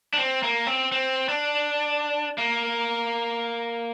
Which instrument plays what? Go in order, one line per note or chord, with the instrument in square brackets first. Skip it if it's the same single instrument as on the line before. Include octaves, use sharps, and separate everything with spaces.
[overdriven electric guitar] D4
C4
A#3
C4
C4
D4
A#3